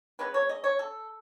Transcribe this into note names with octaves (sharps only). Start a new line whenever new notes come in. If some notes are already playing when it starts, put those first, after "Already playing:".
C#3 G#3 B3 B4
C#5
D#5
C#5
A4